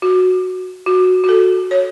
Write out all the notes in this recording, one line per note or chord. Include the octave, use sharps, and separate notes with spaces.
F#4
F#4
F#4
A4
C#5